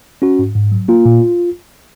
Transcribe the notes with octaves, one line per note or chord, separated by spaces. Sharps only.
C#4 F#4
G#2
G#2
F#3
A#3 F4
A#2